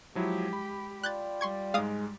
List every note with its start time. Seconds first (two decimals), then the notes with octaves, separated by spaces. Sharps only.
0.15 F3 F#3 G#3 E4 G4
0.53 B5
1.03 F4 D5 G5 F#6 G6 A6
1.41 G3 C6 C#6 G#6
1.74 G#2 G#3 F5 D#6 F6